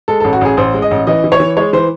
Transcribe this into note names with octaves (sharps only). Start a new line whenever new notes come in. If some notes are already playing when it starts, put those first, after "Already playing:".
G#3 A4
A4
A1
F#4
A1 G#4
A1 C5
G#3
D#5
A1
E3 D#5
E3
C#5
E3
G#3 C#5
E3 C5